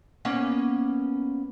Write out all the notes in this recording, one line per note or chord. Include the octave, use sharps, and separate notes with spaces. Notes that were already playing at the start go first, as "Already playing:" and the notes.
A#3 B3 C#4